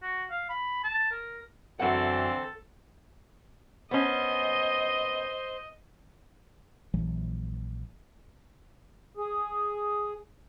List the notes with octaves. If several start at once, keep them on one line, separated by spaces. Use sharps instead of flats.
F#4
F5
B5
A5
A#4
F#2 D3 E3 C4 A4 F#5
B3 C#4 C5 D#5
A#1 E3 F#3
G#4